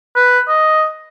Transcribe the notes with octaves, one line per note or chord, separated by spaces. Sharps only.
B4
D#5